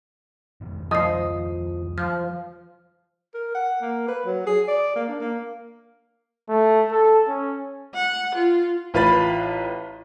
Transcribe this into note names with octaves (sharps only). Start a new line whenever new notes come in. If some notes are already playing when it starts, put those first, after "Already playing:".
F2 B2 D#3
F3 D#5 D#6 C7
F3 F5 F6
A#4
F#5
A#3
B4
F#3
G#4
D5
A#3
D4
A#3
A3
A4
C#4
F#5
F4
A1 F4 B4 B5 A6